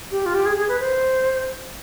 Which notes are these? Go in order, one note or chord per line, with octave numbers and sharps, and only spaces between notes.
G4
F4
G4
G#4
G#4
B4
C5